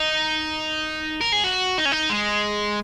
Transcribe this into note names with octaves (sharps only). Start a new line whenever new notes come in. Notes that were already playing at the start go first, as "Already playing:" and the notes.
Already playing: D#4
A#4
G#4
F#4
D#4
C#4
D#4
G#3